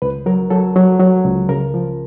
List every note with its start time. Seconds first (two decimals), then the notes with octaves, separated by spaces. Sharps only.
0.02 C#2 B4
0.26 F#3 A#4
0.50 F#3 A4
0.76 F#3
0.99 F#3
1.24 C#2
1.49 C#3 A#4
1.74 F3